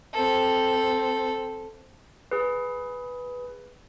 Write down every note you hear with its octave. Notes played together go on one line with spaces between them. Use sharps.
C4 A4
G#4 B4